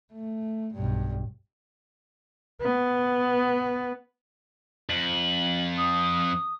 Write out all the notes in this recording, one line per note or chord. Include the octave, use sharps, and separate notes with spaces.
A3
B1 G2
B3
F2 F#7
D#6